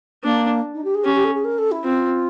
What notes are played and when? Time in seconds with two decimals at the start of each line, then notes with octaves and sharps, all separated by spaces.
0.23 A#3 D4
0.74 D#4
0.84 G4
0.94 G#4
1.04 C#4 G4
1.15 G4
1.24 A4
1.34 G#4
1.44 A#4
1.58 A4
1.71 E4
1.84 C4 F4